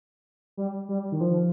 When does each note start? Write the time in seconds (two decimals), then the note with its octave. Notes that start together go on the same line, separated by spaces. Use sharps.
0.57 G3
0.89 G3
1.12 D#3
1.21 F3